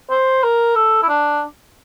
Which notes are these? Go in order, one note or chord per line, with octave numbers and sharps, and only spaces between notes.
C5
A#4
A4
E4
D4